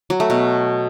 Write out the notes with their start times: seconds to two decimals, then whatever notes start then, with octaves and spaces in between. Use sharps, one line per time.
0.10 F#3
0.20 A3
0.30 B2